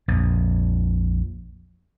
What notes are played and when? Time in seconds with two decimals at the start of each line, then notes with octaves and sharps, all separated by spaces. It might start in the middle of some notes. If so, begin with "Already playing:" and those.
0.08 A#1 F2